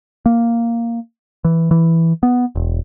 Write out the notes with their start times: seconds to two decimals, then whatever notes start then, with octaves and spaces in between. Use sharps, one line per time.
0.26 A#3
1.45 E3
1.71 E3
2.23 B3
2.55 E1